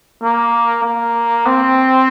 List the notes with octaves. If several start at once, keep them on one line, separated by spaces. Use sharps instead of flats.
A#3
A#3
C4